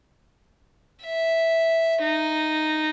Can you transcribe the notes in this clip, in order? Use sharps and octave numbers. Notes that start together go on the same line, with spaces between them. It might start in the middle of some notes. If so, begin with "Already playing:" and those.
E5
D#4